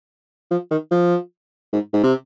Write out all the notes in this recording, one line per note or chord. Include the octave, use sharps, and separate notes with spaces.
F3
D#3
F3
G#2
G#2
C3